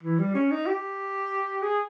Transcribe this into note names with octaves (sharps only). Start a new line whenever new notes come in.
E3
G3
C#4
D#4
G4
G#4